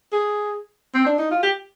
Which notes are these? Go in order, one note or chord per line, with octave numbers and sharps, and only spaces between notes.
G#4
C4
D4
D#4
F4
G4